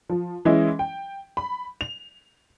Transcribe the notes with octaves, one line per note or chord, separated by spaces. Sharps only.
F3
E3 G#3 C#4 E4 D#5
G5
B5
F7